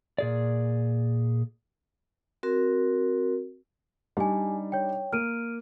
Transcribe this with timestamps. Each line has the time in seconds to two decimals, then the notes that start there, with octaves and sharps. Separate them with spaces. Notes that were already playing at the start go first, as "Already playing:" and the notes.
0.18 A#2 G#4 D5
2.43 C4 F#4 A#4
4.17 G3 D4 D#4 G4 G#5
4.72 C#5 G5
5.13 A#3 F6 D7 D#7